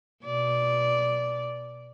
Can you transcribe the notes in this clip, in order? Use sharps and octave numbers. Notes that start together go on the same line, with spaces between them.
B2 D5